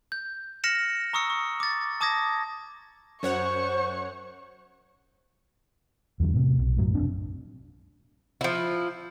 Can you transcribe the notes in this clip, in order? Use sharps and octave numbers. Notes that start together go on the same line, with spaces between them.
G6
F6 A#6 C#7 E7 F#7
A#5 C#6 D#6 E6 C#7
C#6
D6 A6
A5 D6 D#6 G#6 A#6
F#2 C5 C#5 F#5 C#6
E2 D3 F#3
A2 C3
B1
F#2 A2 F#3
F1 D#2 C4 D4
F3 E4